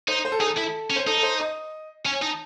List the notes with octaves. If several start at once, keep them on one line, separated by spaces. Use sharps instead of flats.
D#4 C5
C5
A4
D#4 G#4
A4
E4
C#4
C5
D#4 A4
A4
C5
D#5
C#4 G#5
D#4 A5